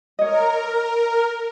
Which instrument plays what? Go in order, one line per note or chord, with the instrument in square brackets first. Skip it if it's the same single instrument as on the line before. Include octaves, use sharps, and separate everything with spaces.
[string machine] A#4 [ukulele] C#5 D#5